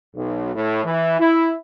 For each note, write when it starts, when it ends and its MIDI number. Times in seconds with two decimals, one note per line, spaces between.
0.16 0.54 35
0.54 0.82 45
0.84 1.16 52
1.19 1.51 64